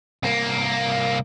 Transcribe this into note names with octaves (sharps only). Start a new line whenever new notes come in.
C2 A#3